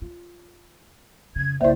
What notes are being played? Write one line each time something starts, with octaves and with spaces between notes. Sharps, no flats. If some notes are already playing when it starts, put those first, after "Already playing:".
F4
F2 C#3 G#6
C2 C#3 A#3 E4 C5 D5 E5